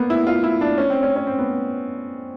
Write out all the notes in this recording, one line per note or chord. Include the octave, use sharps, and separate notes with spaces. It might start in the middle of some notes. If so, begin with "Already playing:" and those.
Already playing: A#3 B3
E4
F4
E4
D4
C#4
C4
C#4
C#4
C4
B3